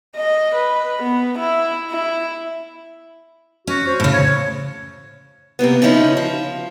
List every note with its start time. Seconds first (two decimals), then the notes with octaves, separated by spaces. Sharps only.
0.16 D#5
0.55 B4
1.03 B3
1.38 E4
1.90 E4
3.67 C#4 F#4
3.87 C5
4.00 A2 C#3
4.13 C#5
5.59 C3 G3 A#3 B3
5.82 C#3 F3 G#3 C#4 D#4 E4
6.17 F3